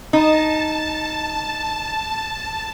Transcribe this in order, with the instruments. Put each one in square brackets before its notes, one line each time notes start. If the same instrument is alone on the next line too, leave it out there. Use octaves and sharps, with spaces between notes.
[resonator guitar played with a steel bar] D#4 [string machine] A5